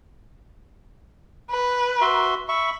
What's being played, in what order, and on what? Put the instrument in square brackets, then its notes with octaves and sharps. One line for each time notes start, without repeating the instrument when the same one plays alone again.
[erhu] B4
[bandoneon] F#4 E5 C6
[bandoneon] E5 C#6 [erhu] B5